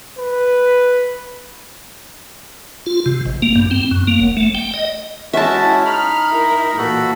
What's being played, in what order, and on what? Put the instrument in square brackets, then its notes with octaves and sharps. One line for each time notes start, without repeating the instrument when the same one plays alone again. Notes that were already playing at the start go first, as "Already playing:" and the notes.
[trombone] B4
[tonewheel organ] F4
C3
G#1
A#3
G2
C4
F#2
A#3
F#1
A3
G5
D#5
[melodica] G#3 C#4 F#4 [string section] E4 [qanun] E5 A5
[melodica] D#4 B5 [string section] F6
[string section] E4 A#4
[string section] A#2 E3 [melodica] F#4 A4 B5